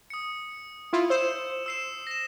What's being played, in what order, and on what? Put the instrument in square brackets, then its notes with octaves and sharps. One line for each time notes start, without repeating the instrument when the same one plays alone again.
[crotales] D#6 C#7
[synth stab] E4 F4
[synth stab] C5 [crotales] E6 E7
[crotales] E6 C7 E7
A#6 E7